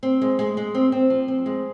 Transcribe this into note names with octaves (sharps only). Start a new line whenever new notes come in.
C4
G#3
G#3
G#3
C4
C4
F3
C4
G#3